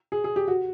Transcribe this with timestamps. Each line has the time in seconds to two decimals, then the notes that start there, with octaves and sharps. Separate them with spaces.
0.12 G#4
0.24 G#4
0.36 G4
0.48 F#4